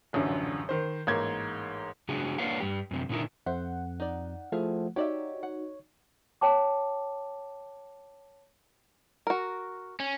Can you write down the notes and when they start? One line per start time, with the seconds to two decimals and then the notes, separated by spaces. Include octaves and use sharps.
0.13 D#1 A1 F#2 D3
0.69 D#3 C5
1.07 A1 G#2 A#3 G#6
2.09 C#3 F#3 D4 F#4 G#4
2.38 A#3 D4 B4 C#5 F5 F#5
2.60 G2 G4
2.91 F#2 C3
3.09 A#2 D3 D#4 E4 A#4
3.46 F2 C5 E5 F#5
4.00 D#4 D5
4.52 F3 A3 E4 G#4 F5
4.96 D#4 F#4 G4 C#5 D5 E5
5.43 F#5
6.41 C#5 G5 A5 D6
9.27 F#4 A#4
10.00 C#4